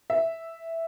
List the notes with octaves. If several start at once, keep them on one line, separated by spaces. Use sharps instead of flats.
E5